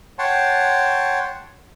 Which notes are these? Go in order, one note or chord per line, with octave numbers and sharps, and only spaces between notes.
C#5 F#5 G5 A5 C6